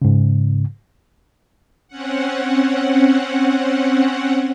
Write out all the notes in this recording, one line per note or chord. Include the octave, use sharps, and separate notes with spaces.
G#2 C#3
C4 C#4 F#5